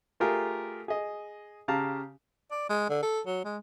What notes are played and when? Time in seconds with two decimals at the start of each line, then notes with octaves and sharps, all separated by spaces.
0.20 A3 F4 G4 G#4 A#4
0.88 G#4 D#5
1.68 C#3 G4 F5 A5 A#5
2.51 D5
2.69 G#3
2.89 D3
3.03 A4
3.26 F#3
3.44 G#3